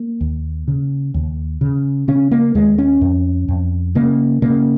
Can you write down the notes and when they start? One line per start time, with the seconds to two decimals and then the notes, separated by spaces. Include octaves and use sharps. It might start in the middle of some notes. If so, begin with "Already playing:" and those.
Already playing: A#3
0.21 D#2
0.68 C#3
1.14 D#2
1.61 C#3
2.08 C#3 C#4
2.31 A#3
2.55 D#2 G#3
2.78 C#4
3.01 F2
3.48 F2
3.95 C#3 A#3
4.42 C#3 A#3